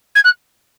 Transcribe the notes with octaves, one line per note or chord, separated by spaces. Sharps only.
G#6
F#6